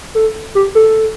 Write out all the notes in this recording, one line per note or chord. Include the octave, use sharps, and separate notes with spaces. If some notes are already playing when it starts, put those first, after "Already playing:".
A4
G4
A4